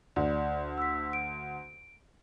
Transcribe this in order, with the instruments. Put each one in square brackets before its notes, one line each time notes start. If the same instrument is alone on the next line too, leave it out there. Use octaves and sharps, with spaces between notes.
[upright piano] D2 [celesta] D5
[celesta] E6 B6
D7